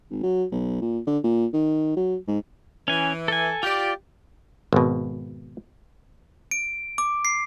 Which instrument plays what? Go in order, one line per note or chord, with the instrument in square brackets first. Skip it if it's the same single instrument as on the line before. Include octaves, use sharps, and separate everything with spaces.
[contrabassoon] G#1
F#3
B1
A#2
D3
A#2
D#3
F#3
G#2
[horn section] E3 [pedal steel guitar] C#4 G#5
[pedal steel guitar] A4 G#5
[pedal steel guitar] F4 D5 [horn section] G4
[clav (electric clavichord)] G#1 B2
[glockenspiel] D7
D6
C7